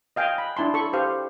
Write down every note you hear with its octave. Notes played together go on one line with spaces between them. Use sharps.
D#5 F5 G5 G#5
B5
D4 E4 A5 C6
A4 B5 C#6
G4 C5 F5